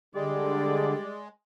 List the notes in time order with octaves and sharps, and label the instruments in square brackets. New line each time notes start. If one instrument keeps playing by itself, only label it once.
[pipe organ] D3 [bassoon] G3 [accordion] G#3 [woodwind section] G#4 D5